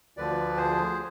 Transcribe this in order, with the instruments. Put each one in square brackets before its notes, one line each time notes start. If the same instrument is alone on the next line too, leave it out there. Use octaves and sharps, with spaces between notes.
[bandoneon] D2 D3 F3 B4 D5
G#4 C5